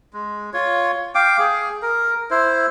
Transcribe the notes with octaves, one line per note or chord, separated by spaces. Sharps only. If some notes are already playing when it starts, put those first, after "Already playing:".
G#3
F4 C#5
F5 G5 D6
G#4
A#4
E4 C5